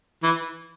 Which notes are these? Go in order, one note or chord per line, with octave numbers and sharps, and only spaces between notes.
E3